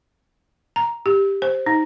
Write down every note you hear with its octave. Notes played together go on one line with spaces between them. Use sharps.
A#5
G4
C5
D#4